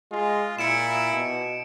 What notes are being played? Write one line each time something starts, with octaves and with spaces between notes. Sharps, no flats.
G#3 F4
A#2 E4 C#7 D7 E7
B2